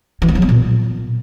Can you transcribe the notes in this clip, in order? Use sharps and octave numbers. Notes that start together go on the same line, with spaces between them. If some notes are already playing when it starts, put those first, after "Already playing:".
E3
A#3
F#3
B3
A#2